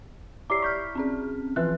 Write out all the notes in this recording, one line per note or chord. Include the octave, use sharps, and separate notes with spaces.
E4 G4 D5 A#5 D6 C7
C#6 F6 G6 B6
C4 C#4 G#4
E3 F3 B4 E5 F#6